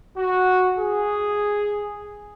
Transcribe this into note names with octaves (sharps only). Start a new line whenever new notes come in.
F#4
G#4